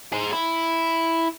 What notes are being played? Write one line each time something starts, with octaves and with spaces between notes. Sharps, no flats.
G#4 C5
E4